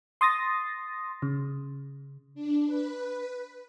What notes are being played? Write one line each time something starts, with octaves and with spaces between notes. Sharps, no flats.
C6 D#6 A6 A#6
C#3
D4
B4